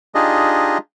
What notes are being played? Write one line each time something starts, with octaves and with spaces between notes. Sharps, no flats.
D4 D#4 F4 G4 G#4 D#5